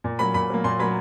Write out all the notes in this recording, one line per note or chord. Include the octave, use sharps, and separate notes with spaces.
A#2
F#3 A#3 B5
A#2 B5
F#3 A#3
A#2 C6
F#3 A#3 B5